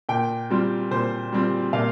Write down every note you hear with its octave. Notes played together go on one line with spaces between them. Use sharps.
A#2 G5
G3 C4 F4
A#2 C5
G3 C4 F4
A#2 F5